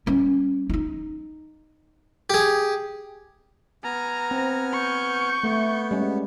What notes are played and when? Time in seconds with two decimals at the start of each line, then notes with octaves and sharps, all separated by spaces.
0.06 G3 C#4
0.69 D#4 E4
2.30 G4 G#4
3.84 B3 G#5 A#5 F6
4.31 C4
4.73 C#6 G6
5.44 A3 B3
5.91 G3 G#3 C#4